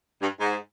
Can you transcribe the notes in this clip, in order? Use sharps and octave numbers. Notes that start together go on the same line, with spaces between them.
G2
G#2